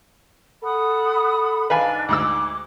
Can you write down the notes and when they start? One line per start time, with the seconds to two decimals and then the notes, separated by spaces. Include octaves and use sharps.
0.63 A4 F#5 B5 D#6
1.70 G#2 D4 B4 D#5 F5 G#5
2.08 D2 G#3 D6 E6